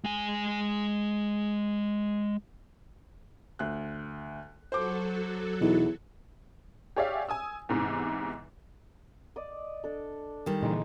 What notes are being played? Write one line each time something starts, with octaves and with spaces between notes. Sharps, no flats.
G#3 G#5
D2 F#6
F#3 F#4 A4 C5 D6
E2 B2 E3 D#4
G4 G#4 C#5 D5 E5 F5
G#5 D#6 E6
E2 G#2 C3 E3
D5 D#5 D#6
D4 A4
D#3 G3
A#2 D3 E3 G#3 D#4